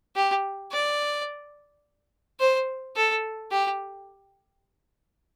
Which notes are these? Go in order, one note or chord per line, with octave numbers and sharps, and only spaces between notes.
G4
D5
C5
A4
G4